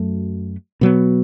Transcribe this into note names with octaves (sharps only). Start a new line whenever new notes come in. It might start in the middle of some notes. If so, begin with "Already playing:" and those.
Already playing: F#2 F#3 A3
B2 F#3 B3